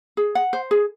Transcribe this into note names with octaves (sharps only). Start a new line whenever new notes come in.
G#4
F#5
C5
G#4